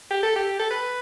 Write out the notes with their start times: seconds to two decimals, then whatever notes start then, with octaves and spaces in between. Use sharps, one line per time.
0.11 G4
0.23 A4
0.36 G4
0.59 A4
0.70 B4